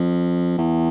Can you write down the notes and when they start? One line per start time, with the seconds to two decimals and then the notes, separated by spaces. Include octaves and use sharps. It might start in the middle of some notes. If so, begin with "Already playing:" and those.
Already playing: F2
0.58 E2